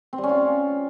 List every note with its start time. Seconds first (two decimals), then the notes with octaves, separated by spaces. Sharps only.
0.13 C4
0.18 G3
0.24 C#4
0.29 F4